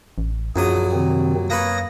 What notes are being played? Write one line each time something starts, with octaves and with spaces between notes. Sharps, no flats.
A1
A#1 F#2 F#3 G#4 D#6
C3 D#3 C4
A#3 B4 C#5 D#6 A#6